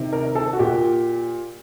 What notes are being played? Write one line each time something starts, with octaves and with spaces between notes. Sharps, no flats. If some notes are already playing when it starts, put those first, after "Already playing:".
Already playing: C3 D#3
A#4
A4
F#4
A#2 G4